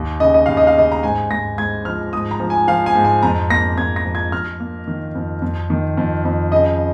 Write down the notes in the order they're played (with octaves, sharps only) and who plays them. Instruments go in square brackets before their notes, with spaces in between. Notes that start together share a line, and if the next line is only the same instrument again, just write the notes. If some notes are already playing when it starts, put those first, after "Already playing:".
Already playing: [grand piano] D#2
C#3 D#5
D#5
D#2 F5
D#5
F5
C#3 D#5
A#5
G#2 G#5
G#2 A#6
G#2 G#6
F3 F6
G#2 D#6
A#5
F3
G#5
F3 F5
G#5
G#2
G#5
F2 A#5
A#3 A#6
F2 G#6
A#6
F3
G#6
F2 F6
A#3
D#3
F2
F2
D#3
F2
F2
C#3 D#5